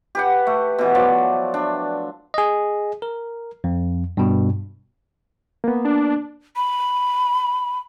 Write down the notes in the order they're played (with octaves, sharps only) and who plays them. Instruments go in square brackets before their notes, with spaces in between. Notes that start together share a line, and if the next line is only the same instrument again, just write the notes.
[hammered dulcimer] G4 B4 F#5
A3
B2 E3
F3 F#3 D5
D4
[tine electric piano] G#4 D#5
A#4
F2
G2 B2
[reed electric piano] A#3 B3
[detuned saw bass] D4
[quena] B5